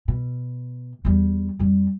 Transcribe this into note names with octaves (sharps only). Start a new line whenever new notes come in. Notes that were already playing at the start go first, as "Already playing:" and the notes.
B2
E2 G3
F2 G3